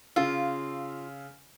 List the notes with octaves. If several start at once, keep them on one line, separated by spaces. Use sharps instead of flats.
C#3 F4 F5 E6